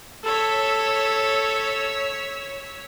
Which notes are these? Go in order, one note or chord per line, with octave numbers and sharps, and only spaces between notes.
A4 C#5 E6 B6